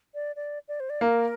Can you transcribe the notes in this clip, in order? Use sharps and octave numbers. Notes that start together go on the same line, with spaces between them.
D5
D5
D5
C5
D5
A#3 A#4